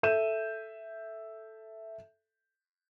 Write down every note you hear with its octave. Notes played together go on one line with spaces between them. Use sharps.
A4 E5 G6 D#7 E7